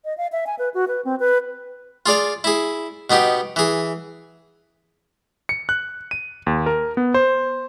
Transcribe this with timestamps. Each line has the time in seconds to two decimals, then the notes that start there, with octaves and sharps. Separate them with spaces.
0.05 D#5
0.18 F5
0.32 E5
0.47 G#5
0.59 B4
0.74 F#4
0.88 B4
1.05 C4
1.20 B4
2.06 F4 G#4 D5 F5
2.44 E4 G#4
3.10 B2 B3 D#4 G4
3.56 E3 G#4
5.49 C#7
5.69 F#6
6.11 D#7
6.47 D#2
6.66 A#4
6.97 B3
7.14 C5